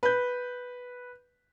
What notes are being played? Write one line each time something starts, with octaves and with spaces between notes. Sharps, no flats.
B4 G6